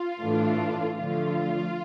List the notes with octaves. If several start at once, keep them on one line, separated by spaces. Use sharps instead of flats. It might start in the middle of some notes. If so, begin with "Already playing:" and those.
Already playing: F4
A2 E3 A3 D4
D3 F3 A3 F4